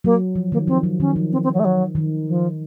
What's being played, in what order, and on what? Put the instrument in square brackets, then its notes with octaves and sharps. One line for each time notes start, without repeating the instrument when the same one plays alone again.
[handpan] F#3 [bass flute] A#3
[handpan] F3
[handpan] D#3 [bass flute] A#3
[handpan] F3 [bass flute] C4
[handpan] F#3
[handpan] D#3 [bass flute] C#4
[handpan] F3
[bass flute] C4
C4
F#3
A3
F#3
[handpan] D#3
[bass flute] F3